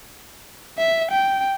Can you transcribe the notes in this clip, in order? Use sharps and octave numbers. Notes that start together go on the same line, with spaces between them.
E5
G5